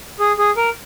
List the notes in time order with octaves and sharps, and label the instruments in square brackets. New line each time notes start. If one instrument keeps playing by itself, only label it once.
[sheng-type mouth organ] G#4
G#4
A#4